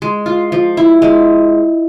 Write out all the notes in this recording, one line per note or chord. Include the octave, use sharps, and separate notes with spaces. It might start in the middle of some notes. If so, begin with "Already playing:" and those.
G#3
F4
F3
E4
G#3